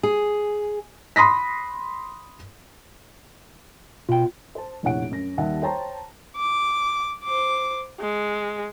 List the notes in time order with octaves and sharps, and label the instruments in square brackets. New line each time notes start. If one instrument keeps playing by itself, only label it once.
[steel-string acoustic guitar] G#4
[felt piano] B5 C6 D#6 A#6 B6
[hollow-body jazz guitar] B2 G5 [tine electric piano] F4
[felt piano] C5 A5
F1 A#1 E4 C#5 F#5 D7
F#2 A#6
D#2 G3 E5 F#5 A5
C5 C#5 G5 A5 A#5 C6
[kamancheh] D6
C5 D6
G#3